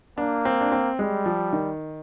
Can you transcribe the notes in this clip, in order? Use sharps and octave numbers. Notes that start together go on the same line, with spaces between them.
A#3 D4
C4
D4
C4
G3 G#3
F3
D#3